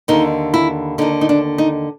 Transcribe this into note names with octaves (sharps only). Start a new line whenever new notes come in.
D#2 D3 D#4
E4
D#2 D3 D#4
D#4
D4
D#4